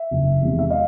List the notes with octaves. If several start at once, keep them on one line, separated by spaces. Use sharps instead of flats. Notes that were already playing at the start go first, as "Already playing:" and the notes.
Already playing: E5
F#1
E2 C3 D#3 G#3
E5
D#5 F5